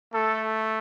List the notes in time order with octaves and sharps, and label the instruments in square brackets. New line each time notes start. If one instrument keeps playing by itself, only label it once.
[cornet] A3 [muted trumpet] A4